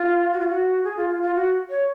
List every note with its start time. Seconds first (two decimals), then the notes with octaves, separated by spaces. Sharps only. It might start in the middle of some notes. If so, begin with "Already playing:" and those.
Already playing: F4
0.32 F#4
0.40 F4
0.48 F#4
0.84 G#4
0.97 F4
1.10 F4
1.22 F4
1.35 F#4
1.70 C#5